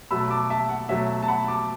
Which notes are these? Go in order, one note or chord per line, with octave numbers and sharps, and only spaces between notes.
B2 F#3 A3 B5 E6
A5 D6
E5 A5
F#5
B2 F#3 A3 E5
A5
F#5 B5
A5 D6